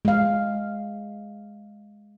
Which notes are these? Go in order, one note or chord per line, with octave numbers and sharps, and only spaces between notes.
G#3 F5